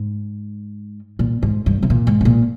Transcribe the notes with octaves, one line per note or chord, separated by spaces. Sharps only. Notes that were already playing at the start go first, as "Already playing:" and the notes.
Already playing: G#2
A#2
G#2
G2
C3
A#2
G#2
C3
A#2